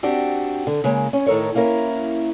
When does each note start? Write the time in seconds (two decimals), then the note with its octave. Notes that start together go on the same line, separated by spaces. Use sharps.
0.03 C4 D4 F#4 G4 G5
0.67 D3
0.84 C#3 G#3 A#3
1.13 C#4
1.26 A2 D#3 A4 A#4 C#5
1.55 A#3 C#4 E4 A#4